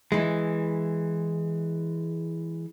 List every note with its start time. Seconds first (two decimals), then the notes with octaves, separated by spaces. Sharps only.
0.12 E3 G#3